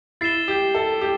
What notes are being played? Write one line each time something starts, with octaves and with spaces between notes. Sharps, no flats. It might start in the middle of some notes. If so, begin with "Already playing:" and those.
E4 A6 C7 E7 G7
G4
A4
G4